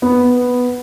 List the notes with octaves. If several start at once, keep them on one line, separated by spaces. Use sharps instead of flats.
B3